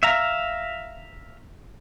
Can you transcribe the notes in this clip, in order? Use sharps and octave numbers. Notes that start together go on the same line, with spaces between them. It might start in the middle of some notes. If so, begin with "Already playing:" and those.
E5 F5 A#5